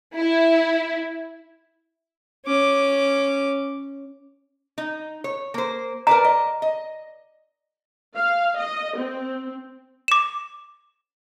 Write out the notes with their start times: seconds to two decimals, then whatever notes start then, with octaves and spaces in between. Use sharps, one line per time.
0.17 E4
2.46 C#4 D6
4.78 D#4
5.24 C#5
5.54 A#3 C5
6.07 A#4 B4 D5 A#5
6.25 D#5
6.62 D#5
8.15 F5
8.58 D#5
8.98 C4
10.08 D6 E7